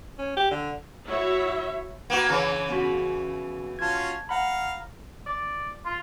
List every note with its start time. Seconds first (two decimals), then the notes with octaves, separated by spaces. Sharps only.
0.19 C#4
0.36 G4
0.51 D3
1.06 E4 F#4 C#5 E5
2.10 A#3 B3 F#4
2.29 C#3 E3 C#5 A#5
2.70 B3 C#4 F#4
3.79 C#4 F4 F#4 A5 G#6
4.29 F5 F#5 A#5 B5
5.26 D5
5.85 F4